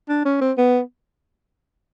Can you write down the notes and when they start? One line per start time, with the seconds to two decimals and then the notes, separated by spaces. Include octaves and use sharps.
0.09 D4
0.25 C#4
0.41 C4
0.58 B3